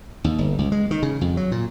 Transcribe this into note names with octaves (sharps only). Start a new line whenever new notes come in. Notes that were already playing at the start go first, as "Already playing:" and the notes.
D#2
G1
C#2
G#3
D#3
C#3
F2
F#3
A#2